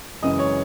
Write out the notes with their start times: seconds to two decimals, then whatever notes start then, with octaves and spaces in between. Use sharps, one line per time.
0.23 F#2 C#3 E3 G#3 D#5 D#6
0.39 C#5 C#6